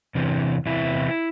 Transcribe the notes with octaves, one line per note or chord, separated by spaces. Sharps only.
E2 C3 E3
E2 C3 E3 E4